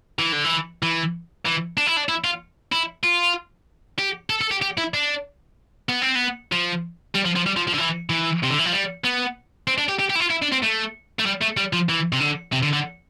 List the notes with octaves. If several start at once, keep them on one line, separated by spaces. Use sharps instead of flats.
E3
D3
E3
E3
E3
D4
E4
D4
E4
F4
E4
F4
G4
A4
A4
G4
G4
E4
D4
B3
C4
B3
F3
G3
F3
F3
G3
F3
F3
D3
E3
E3
C3
D3
E3
F3
G3
B3
C4
D4
G4
G4
G4
E4
F4
E4
D4
C4
A3
A3
G3
A3
G3
F3
E3
C3
D3
C3
D3
D3